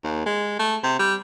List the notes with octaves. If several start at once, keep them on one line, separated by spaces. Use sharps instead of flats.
D#2
G#3
A3
C3
G3